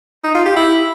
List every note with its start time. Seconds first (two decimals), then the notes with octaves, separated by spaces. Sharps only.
0.24 D#4
0.34 F4
0.45 G4
0.56 E4